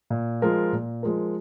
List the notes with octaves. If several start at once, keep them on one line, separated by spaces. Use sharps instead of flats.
A#2
F3 G#3 F4 A#4
A#2
F3 G#3 F4 A#4